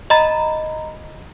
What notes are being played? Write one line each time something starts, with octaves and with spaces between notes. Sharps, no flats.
D#5 A#5 B5 A6